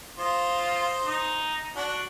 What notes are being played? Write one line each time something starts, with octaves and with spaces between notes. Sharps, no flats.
F4 C5 D#5
D#4
D4 F#4